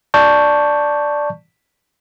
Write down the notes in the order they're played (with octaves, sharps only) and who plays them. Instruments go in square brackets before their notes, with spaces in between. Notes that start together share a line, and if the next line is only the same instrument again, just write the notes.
[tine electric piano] D5 A5 C#6 G6